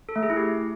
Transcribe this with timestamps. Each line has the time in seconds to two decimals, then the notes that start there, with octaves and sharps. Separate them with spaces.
0.09 A4
0.16 A3
0.23 G#4
0.30 E4
0.37 G4